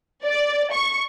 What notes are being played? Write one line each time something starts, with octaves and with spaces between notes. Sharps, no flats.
D5
C#6